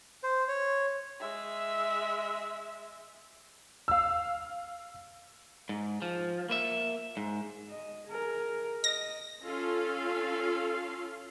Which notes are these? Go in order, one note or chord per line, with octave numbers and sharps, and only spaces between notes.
C5
C#5
G#3 E5
F5 E6
G#2
F3
A#3 E5
G#2
D#5
G#4 A#4
D#5 A#6
C#4 F4 A4 F5